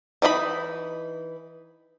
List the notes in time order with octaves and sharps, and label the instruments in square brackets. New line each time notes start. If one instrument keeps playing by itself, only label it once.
[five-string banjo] E3 D#4 E4 B5